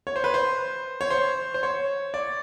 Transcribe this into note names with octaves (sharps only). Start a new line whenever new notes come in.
C#5
C5
B4
C5
C#5
C5
C5
C#5
D5